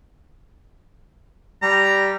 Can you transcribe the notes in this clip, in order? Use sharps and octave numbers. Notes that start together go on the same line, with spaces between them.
G3 A#5